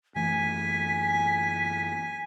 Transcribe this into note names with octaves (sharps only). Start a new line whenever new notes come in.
F#2 E3 A3 G#5 B6